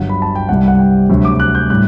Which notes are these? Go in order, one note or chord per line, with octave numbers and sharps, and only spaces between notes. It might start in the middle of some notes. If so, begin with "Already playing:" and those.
Already playing: G1 G2 F#3 F#5
B5
A5
G5
C2 C3 G3 F#5
F#5
G5
D2 C3 F#3
D6
F#6
G6
A2 G3 F#6